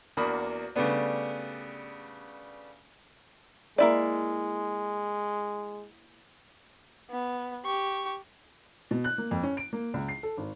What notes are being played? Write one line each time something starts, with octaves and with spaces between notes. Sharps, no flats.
E2 A#3 D4 F#4 B5 D#6
C#3 G3 A3 B3 D4
G#3 A#3 E4 D5
B3
G4 C#6
B2
F#6
A#3
F2
C#4
D7
A#3
C#2
C7
A4
G#1